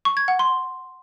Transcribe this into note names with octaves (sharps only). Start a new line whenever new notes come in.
C#6
G#6
F#5
C6